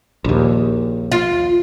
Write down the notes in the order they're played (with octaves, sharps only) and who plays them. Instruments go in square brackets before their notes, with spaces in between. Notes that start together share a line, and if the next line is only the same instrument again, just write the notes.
[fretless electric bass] A#1 D#2
[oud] F4